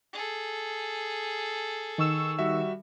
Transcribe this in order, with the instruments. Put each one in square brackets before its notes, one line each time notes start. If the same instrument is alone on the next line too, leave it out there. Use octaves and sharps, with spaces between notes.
[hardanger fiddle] G#4 A4
[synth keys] D#3 C#6 E6
[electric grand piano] G3 F#4 E5